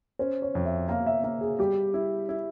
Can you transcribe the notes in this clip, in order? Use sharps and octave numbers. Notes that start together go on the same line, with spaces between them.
C#4 C5
C#5
F2
E5
A#3 F5
E5
A#3 E5
G#4
G3 G4
E4
E4